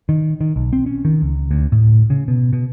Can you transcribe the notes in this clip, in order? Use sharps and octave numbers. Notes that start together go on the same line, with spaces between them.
D#3
D#3
B1
C4
C#4
D#3
C#2
D2
A2
C#3
B2
B2